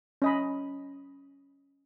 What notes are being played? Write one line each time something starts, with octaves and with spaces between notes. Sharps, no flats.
C#4 D#5 B5